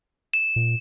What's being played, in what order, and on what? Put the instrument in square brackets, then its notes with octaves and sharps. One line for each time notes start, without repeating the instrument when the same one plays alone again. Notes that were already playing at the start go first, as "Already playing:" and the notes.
[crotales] E7
[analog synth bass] A#2